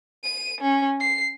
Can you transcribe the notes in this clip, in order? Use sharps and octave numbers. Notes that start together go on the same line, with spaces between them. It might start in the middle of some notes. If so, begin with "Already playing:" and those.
D#7
C#4
C7